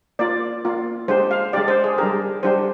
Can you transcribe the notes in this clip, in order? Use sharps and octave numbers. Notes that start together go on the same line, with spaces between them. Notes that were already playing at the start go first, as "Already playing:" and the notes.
A#3 F4 D5
A#3 F4
G#3 D4 G4 C5
F5
G#3 D4 G4 D5
C5
G#4
G3 D4 G4 A#4
G3 D4 G4 C5